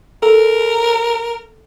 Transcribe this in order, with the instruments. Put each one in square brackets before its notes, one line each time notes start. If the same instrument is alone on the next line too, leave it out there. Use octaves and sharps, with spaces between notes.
[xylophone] A4 [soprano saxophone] A#4